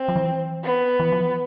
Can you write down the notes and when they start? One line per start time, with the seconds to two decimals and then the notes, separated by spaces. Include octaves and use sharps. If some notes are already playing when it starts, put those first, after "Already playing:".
Already playing: C4
0.08 F3
0.16 E3
0.64 B3
1.00 E3
1.12 F3